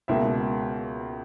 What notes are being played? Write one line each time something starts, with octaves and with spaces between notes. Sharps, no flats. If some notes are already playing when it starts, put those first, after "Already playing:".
C#2 B2 A#3 E5